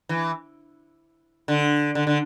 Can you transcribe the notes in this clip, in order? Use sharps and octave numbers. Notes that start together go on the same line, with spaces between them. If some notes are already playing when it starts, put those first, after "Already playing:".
E3
D3
D3
D3